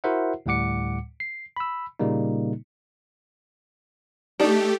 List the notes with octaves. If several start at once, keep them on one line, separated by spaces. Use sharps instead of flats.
E4 F#4 A#4 C5 E5 F#5
D2 A2 G3 F#5 D6 C#7
C7
B5 E6
A#2 C#3 G3 A#3 D#4
A3 D4 D#4 G4